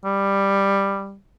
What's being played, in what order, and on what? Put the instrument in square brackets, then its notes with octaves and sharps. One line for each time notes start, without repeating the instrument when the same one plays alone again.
[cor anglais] G3